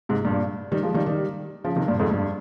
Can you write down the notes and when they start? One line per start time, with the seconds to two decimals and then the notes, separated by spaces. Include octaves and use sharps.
0.09 G#2 C3
0.25 G2 A#2
0.72 D#3 G3
0.83 F3 G#3
0.94 D#3 G3
1.06 D#3 G3
1.64 C#3 F3
1.76 C3 D#3
1.88 G2 A#2
1.99 F2 G#2
2.11 G2